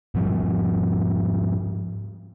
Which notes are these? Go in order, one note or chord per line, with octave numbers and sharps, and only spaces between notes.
G#2 F3 G3